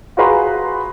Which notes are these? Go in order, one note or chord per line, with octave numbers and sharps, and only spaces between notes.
F4 F#4 G#4 B4 A#5 C6